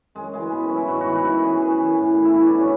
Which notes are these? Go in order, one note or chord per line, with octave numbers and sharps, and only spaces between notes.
F#2 G#3
C#3 E3 G#3
B2 B3
C#4
F#3
E4
G#2 F#4
F#4
E3
F#4
E4
F#2 F#4
E3 G#4
F#2 G#4
E3
A2
E3
E4
B2 F#4
D4
F#3
C#4